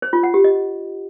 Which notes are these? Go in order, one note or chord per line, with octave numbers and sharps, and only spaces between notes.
C5
F4
F#5
G4
D#5